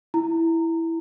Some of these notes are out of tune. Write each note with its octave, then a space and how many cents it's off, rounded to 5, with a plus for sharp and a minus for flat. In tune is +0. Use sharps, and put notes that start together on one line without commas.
E4 +0 A#5 -20